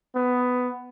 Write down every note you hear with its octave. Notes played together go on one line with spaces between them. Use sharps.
B3